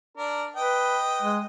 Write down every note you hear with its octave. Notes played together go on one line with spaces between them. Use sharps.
D4 A#4
B4 D#5 G5
G#3